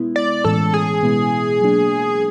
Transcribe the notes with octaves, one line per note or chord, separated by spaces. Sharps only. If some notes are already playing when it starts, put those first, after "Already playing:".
Already playing: B2 G#3 B3 E4
D5
A2 E3 G#3 C#4 A4
G#4
B2 G#3 B3 E4
F#3 A#3 D4